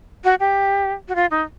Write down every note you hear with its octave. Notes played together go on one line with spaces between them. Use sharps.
F#4
G4
F#4
F4
D#4